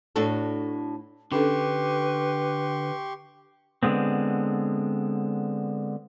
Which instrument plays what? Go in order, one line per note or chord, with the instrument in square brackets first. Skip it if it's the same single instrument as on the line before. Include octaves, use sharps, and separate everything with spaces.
[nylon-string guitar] A2 D4 F#4 A4
[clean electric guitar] D3 [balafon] C#4 D4 A4 [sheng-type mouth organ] G4 C6 C#6 [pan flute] B4
[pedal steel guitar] D3 G#3 B3 C4